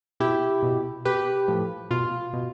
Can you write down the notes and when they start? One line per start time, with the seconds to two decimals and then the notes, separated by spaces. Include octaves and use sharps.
0.20 B2 E4 G4
0.63 B2
1.05 B2 G4 B4
1.48 A2 F3
1.91 B2 F4
2.33 B2